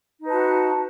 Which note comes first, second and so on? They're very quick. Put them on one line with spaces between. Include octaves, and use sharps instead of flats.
D#4 B4 A5 F#4